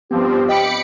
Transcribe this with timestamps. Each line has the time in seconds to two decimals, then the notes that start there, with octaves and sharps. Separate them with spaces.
0.11 G2 F3 B3 C4 G4
0.49 D#5 G5 B5 D6 C#7